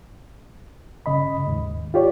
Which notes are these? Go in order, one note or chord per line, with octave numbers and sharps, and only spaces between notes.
G2 C#3 D#5 B5
D#2 G#2
F4 G4 C#5 D5